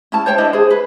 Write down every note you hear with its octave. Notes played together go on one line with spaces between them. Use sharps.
C#4 E4 A5
C5 C#5 G5 A5
D4 E4 D#5 E5
G#4 C5
B4